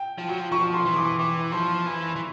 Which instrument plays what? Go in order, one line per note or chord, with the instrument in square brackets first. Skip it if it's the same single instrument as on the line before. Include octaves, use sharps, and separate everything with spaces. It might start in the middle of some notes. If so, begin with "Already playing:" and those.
Already playing: [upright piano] G5
[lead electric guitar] F3
F#3
F3
[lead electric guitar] F3 [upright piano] C#6
[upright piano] C6
[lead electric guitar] E3
[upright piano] D6
[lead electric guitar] E3 [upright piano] C#6
[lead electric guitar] F3 [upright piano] C6
[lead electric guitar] E3
E3